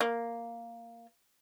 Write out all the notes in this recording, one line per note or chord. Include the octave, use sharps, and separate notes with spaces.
A#3